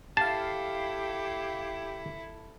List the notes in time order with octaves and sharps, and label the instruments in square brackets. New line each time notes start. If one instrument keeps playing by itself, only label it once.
[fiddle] E4 A4 [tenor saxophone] G4 [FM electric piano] F5 C7 [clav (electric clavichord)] A5